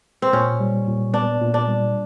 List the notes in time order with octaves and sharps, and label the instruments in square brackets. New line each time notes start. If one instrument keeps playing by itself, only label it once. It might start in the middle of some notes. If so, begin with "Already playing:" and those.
[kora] C4
[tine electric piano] A#2 [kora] C#4
[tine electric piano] G3
A#2
[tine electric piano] B3 [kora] D4
[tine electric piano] A#2
[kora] D4
[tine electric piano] G3